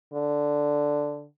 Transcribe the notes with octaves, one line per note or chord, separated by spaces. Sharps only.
D3